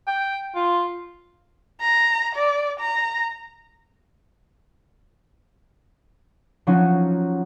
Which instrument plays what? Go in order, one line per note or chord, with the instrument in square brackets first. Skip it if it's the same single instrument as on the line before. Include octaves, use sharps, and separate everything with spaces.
[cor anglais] G5
F4
[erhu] A#5
D5
A#5
[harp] F3 F#3 C#4 D#4 F#4